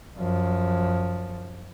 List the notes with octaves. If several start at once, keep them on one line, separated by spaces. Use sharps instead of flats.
F#2 F3